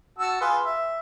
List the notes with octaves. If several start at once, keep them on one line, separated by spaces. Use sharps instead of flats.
F#4 A5 E6
F4 G#4 B4
E5